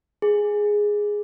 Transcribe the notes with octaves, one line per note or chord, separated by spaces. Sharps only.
G#4